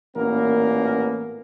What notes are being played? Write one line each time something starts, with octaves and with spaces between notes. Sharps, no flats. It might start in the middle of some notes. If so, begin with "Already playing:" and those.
A1 A#2 A#3 B3 C#4 A#4